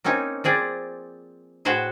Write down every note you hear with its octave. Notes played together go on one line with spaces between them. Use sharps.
A#3 C4 C#4 D#4 G#5
F3 C4 G#4 D5
A2 F#4 G#4 B4 C5 G#5